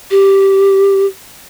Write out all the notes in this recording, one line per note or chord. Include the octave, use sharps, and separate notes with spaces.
G4